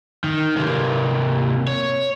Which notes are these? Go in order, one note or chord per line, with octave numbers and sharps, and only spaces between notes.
D#3
C3 A#3
C#5